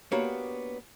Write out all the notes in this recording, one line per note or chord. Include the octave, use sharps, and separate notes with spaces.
A#3 B3 D4 F#4 G4 C#5